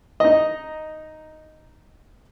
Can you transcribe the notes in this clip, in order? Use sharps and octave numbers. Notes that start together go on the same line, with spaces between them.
D#4 D#5